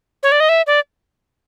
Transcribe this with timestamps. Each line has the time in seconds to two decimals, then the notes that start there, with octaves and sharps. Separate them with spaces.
0.23 C#5
0.32 D5
0.40 D#5
0.49 E5
0.67 D5